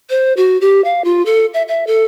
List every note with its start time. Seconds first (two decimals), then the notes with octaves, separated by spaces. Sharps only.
0.10 C5
0.37 F#4
0.61 G4
0.84 F5
1.04 F4
1.26 A4
1.54 E5
1.68 E5
1.87 A4